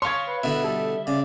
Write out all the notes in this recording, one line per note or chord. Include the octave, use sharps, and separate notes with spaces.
C#5 F5 C6 C#6 G#6
B4
B2 D3 E4 E5
G3 A4
C#3 D5